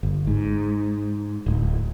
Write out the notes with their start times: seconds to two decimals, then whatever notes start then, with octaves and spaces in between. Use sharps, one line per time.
0.03 G1
0.27 G#2
1.46 D1